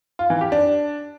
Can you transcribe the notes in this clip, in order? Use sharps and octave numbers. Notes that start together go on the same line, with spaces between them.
F4
E3
G4
D4